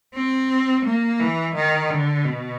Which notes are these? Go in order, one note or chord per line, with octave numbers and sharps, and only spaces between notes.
C4
A#3
E3
D#3
D3
B2